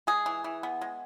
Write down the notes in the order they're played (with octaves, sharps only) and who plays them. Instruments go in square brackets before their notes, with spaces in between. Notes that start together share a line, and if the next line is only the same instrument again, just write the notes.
[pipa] G#3 G#4
E3
E3
B3
G#3